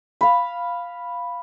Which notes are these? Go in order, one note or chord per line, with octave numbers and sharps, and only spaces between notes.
F5 B5